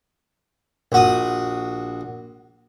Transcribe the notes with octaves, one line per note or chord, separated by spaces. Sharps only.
A#1 F#4 D#6